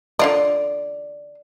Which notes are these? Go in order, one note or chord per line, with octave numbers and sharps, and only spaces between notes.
D3 F4 D5 D#5